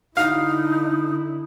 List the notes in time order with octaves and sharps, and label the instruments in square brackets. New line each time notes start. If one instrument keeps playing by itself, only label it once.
[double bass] D3 E4 [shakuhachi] D#4 [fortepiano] F5